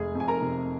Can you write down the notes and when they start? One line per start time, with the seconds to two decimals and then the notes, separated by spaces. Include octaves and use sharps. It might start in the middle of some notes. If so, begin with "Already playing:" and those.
Already playing: F1 G#3 G#4 G#5
0.15 F2
0.20 G#5
0.28 A#4 A#5
0.42 C3